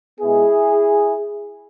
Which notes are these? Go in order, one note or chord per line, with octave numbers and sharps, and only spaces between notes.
B2 G#3 B3 E4 G#4